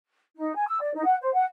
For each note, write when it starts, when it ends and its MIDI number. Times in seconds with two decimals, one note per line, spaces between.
0.36 0.55 63
0.55 0.67 80
0.67 0.79 88
0.81 0.92 74
0.94 1.02 63
1.05 1.15 78
1.21 1.32 72
1.34 1.44 78